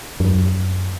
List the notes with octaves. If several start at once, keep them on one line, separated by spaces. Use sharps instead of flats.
F#2